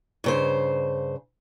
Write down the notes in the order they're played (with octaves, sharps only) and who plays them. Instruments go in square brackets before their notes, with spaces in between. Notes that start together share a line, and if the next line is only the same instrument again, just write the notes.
[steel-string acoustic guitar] G2 C#3 C5